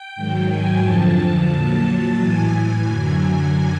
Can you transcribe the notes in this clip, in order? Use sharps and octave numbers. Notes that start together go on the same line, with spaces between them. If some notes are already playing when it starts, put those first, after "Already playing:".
Already playing: G5
G#2 D#3 F#3
G#5
F2 D3 F3 A5
A#2 F#3 A5
A2 E3 G#5
F#2 D3 F#3 G#5